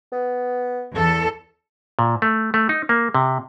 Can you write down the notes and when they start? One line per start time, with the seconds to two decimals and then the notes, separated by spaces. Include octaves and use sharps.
0.12 B3
0.92 E2 A4
1.99 A#2
2.22 A3
2.54 A3
2.69 D#4
2.89 A#3
3.15 C3